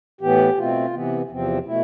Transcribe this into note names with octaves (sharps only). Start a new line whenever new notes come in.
A2 E3 B3 G4
B2 A3 C4 F4
C3 E3 B3
E2 C3 F3 C4
B2 A3 E4